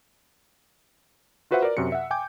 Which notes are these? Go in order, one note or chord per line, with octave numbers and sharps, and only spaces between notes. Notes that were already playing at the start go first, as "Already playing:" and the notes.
F4 F#4 B4 C5 E5 F#5
A#4 D5
F#2 C3 F#4 C#7
E5 F#5
G5 G#5 D6 G6